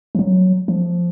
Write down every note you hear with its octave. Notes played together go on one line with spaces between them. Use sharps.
F3
F#3
F3